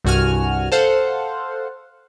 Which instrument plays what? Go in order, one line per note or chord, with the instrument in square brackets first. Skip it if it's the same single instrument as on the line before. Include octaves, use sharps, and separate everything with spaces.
[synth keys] C2 G2 F#4 G#5 F6
A4 C5 F5 F#5